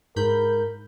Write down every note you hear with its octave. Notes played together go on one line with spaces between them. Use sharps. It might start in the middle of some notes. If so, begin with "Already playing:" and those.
G#2 A#4 B5 G6